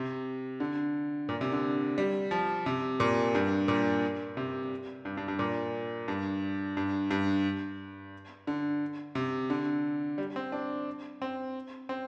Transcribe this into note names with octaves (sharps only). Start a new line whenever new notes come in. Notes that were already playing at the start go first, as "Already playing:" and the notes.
Already playing: C3
D3
A#2
C3
D3
G3
F3
C3
A#2
G2
A#2
C3
G2
G2
G2
A#2
G2
G2
G2
D3
C3
D3
G3
C4
D4
C4
C4